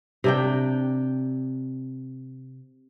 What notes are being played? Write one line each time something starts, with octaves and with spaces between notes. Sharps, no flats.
C3 D4 G5